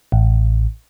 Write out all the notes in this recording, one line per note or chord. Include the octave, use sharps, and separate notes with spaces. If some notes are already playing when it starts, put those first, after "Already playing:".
A1